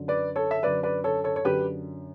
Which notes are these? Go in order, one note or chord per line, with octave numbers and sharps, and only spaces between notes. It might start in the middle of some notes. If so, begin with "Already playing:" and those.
Already playing: F#2 D3
B4 D5
A4 C#5
E5
F#2 D3 B4 D5
B4 D5
A4 C#5
A4 C#5
C#5
F#2 D3 G4 B4